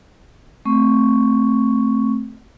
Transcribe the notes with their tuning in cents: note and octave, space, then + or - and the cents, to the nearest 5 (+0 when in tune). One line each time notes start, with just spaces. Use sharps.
A3 +0 C4 +0 C#6 +0